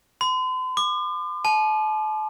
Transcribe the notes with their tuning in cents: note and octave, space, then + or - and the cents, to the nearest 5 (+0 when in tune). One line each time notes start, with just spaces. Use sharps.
C6 -45
D6 +40
A5 -35